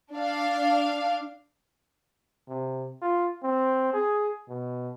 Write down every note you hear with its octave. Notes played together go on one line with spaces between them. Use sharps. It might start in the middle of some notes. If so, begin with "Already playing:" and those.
D4 F5
C3
F4
C4
G#4
B2